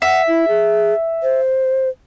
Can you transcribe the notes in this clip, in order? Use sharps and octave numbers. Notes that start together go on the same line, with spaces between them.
E5 F#5
E4
G#4
C5